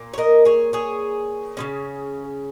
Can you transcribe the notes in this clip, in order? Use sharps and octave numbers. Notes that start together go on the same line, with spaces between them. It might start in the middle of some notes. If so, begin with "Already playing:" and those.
Already playing: A#2 A#3
C#5
A#4 D#5
G#4 C#5
G#4 C#5
C#3 G#3 C#4